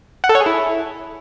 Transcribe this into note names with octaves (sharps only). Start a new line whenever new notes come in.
F#5
A4
C#5
G#4
E4